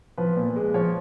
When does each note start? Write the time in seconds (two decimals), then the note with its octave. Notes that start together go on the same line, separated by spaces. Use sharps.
0.18 F3 B4
0.36 A#2
0.56 G#3
0.74 F3 C#5